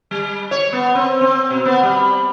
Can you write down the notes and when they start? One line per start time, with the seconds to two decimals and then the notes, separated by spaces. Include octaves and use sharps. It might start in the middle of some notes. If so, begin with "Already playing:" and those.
0.11 G3
0.51 C#5
0.72 B3
0.95 C4
1.21 C4
1.51 B2
1.65 B3
1.83 G3